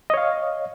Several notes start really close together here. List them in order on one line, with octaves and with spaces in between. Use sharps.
D#5 C#5 F5